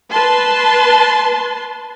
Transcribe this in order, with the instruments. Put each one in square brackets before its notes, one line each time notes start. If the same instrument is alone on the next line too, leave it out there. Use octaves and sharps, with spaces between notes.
[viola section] B4 A5 C6